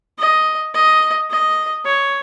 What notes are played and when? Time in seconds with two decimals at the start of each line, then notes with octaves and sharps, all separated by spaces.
0.19 D#5
0.74 D#5
1.30 D#5
1.85 C#5